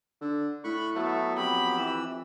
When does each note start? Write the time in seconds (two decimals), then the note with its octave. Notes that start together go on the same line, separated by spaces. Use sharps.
0.21 D3
0.64 A2 B5 C#6 F#6
0.95 F#3 A3 B3
1.37 F2 G4 B5
1.77 E3 E6